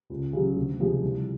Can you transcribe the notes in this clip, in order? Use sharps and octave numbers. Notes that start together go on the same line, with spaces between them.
C#2
C#3 F#3
D2
C3 F3 G#3
C2